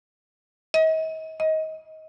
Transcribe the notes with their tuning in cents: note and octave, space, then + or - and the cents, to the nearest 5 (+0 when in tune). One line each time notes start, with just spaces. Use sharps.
D#5 +40
D#5 +20